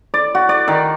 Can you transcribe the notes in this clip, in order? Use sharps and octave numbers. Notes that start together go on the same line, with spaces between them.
D5
F#4
D5
D#3